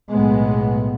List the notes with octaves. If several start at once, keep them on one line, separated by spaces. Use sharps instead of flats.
B1 A2 G#3 B3